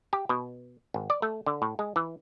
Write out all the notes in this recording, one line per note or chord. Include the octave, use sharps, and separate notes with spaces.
G4
B2
G#1
D5
A3
D3
A2
G#3
E3